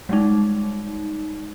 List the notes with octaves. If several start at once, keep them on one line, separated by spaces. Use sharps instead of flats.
G3 G#3 D#4